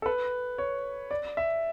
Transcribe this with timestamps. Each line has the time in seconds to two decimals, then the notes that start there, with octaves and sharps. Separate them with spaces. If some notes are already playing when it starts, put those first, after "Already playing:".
0.02 A4
0.06 B4
0.58 C#5
1.11 D5
1.37 E5